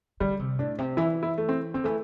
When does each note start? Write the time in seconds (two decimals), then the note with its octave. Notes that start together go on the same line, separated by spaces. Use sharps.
0.20 D3 G3
0.39 C3
0.59 A2 D4
0.78 C3
0.97 E3 E4
1.23 E4
1.38 A3
1.49 C4
1.74 D3 C4
1.84 E3 A3